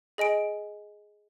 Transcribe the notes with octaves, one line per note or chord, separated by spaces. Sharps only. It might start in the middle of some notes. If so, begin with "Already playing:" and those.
G#4 D#5 G#5 D7